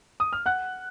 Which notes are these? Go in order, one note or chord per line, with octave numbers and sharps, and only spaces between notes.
D#6
F6
F#5 F#6